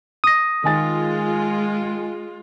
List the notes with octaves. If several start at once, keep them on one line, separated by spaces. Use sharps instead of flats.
D#6 A#6
D#3 G#3 F4 G#5 A6